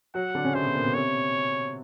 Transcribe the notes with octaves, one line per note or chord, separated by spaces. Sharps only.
F#3 F#4 F#5
D3 D4
C#3 C#4
C3 C4 C5
B2 B3
A#2 A#3
B2 B3
C3 C4 C#5